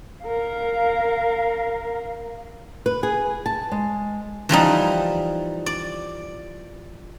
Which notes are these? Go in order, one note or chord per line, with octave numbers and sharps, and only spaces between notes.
A#4 F5
B4
G#4
A5
G#3
E3 F3 G3 D#4
D5